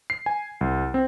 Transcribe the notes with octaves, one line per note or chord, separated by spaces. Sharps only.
C7
G#5
C2
C4